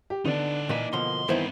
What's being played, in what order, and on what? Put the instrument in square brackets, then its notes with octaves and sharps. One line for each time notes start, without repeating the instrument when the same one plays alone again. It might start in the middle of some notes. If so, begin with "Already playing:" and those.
[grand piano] G4
[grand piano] D3 [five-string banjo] B3 D4 [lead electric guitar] D#4 D5
[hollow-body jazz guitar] A#2 [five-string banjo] E3 A#3 [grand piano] D#5 B6 D#7
[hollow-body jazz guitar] B2 D3 F3 [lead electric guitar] C6
[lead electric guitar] G2 C4 [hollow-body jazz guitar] D#3 B3 E4 [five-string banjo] E3 C5